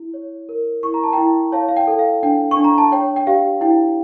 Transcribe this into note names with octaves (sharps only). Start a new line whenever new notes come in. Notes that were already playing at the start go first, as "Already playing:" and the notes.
Already playing: E4
C#5
A#4
E4 C#6
A#5
A5
E4 G5 A#5
C#5 F5 A5
F5
G5
A4
F5
D4 G5
C#6
D4
A#5
A5
C#5 G5
G5
G4 F5
E4 G5